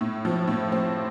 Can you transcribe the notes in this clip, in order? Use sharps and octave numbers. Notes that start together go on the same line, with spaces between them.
A2
F3
A2
C4